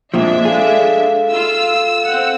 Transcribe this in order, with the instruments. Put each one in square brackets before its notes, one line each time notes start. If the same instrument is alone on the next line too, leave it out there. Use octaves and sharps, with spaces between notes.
[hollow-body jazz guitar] F2 A#2 F3 [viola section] G#3 D4 [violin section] E5
[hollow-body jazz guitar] G#4 [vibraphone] A4 F5
[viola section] F4 [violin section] E6
[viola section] C4 F#5